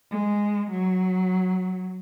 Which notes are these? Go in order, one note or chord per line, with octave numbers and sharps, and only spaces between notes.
G#3
F#3